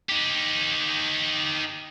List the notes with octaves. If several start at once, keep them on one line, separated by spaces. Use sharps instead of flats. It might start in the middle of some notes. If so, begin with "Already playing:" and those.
D#4 G4